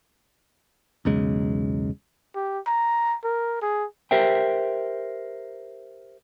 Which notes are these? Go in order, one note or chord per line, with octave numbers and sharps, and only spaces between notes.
B1 E2 C#3 G#3
G4
A#5
A#4
G#4
G4 A#4 C5 E5 G5